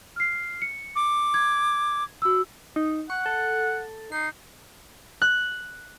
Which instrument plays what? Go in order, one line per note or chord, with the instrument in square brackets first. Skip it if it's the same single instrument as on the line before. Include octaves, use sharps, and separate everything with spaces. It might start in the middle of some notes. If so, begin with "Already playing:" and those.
[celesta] F6 C7
C#7
[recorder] D6
[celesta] G#6
F#4 E6
[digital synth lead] D#4
[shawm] F#5 [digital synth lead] C#6
[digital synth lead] A4
[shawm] D#4 [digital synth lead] C7
[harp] F#6